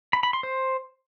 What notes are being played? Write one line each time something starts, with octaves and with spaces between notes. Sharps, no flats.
B5
B5
C6
C5